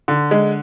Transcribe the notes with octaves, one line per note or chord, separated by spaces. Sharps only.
D3
G#3